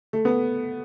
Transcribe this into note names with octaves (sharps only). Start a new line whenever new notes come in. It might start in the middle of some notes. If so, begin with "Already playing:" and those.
A3
B3